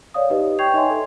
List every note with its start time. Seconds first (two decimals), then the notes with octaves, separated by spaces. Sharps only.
0.14 C#5 D5 F5 D#6
0.30 D#4 G4 B4 D#5
0.59 G5 C#6 G6 G#6 C7 F7
0.74 D#4 C#5 D#5 E5 G#5 C6
0.90 A4